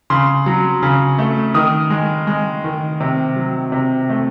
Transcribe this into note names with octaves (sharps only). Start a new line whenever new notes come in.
C#3 C6
F#3
C#3
A3
D#3 D#6
G#3
G#3
D#3
C3
F#3
C3
A3